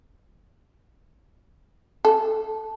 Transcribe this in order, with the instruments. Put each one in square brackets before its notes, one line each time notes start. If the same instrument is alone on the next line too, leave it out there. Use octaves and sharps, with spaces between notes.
[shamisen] A4